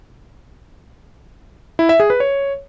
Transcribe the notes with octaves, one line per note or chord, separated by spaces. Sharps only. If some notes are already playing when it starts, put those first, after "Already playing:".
E4
E5
G#4
B4
C#5